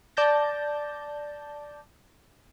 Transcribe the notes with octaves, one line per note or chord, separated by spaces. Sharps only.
D5 A5 G6 A#6